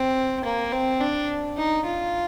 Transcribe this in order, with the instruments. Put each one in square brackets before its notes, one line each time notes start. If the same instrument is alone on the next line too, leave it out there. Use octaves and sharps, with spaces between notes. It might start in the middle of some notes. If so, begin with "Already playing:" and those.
Already playing: [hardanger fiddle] C4
A#3
C4
D4
D#4
F4